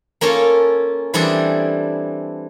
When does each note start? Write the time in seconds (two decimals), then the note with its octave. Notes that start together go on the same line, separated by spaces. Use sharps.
0.21 A#3 C#4 F4 A4 C#5
1.14 E3 G3 C4 D4 G#4 A4